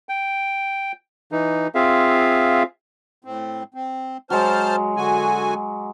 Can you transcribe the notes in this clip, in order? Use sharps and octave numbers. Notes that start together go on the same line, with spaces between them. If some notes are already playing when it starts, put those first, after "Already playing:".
G5
E3 D#4
C4 F4 G#4 E5 F5
A2 C4
C4
F#3 G#3 C5 A5 F6
D3 F#4 G#5